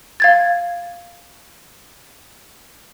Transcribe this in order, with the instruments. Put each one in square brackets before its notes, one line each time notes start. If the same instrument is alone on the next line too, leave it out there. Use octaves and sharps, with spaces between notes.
[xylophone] F5 G#6 A6